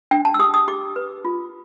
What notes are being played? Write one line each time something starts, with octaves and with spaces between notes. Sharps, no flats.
D4 G5
A5
E6
G4 D#6
D#6
G4 D6
B4
F4